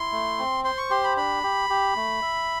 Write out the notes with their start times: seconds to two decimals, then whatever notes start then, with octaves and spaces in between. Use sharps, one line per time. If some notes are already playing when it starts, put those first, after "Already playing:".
Already playing: E4 C6
0.12 A3
0.39 C4
0.64 C5 C6
0.78 C#6
0.90 G4 C6
1.04 B5
1.16 D4 B5
1.43 G4
1.70 G4
1.96 A3
2.22 E5